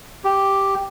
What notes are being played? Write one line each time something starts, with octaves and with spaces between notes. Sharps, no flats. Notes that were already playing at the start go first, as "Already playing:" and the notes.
G4